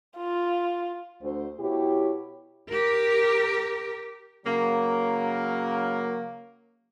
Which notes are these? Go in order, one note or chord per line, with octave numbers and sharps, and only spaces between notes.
F4
D2 C5
B2 E4 G4 C#5
G4 A#4
C#3 F#3 A#3